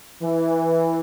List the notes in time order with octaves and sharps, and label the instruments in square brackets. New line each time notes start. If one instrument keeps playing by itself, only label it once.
[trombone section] E3